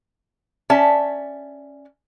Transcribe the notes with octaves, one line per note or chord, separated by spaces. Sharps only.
C#4 D5 E5 A5